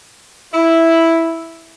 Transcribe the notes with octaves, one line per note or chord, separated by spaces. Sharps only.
E4